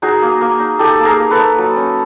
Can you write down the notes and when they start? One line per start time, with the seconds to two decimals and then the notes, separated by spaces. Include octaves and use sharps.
0.02 D#4 F#4 G#4
0.22 A#3
0.41 A#3
0.60 D#4
0.79 D#4 G4 A4
0.99 A#3
1.05 G#4 A#4
1.19 A#3
1.31 A4 B4
1.38 D#4
1.58 F#3
1.76 C#4